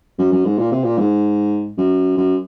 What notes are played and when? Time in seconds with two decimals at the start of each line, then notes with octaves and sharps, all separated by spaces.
0.19 F#2
0.32 F#2
0.45 G#2
0.58 A#2
0.71 C3
0.84 A#2
0.98 G#2
1.78 F#2
2.17 F#2